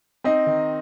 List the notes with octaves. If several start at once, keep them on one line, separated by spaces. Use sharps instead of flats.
C4 D#4 D#5
D#3